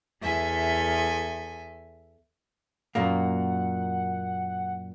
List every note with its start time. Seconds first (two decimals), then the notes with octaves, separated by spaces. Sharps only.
0.22 E2 A4 E5 G#5
2.95 F#2 A#2 A#3 F#5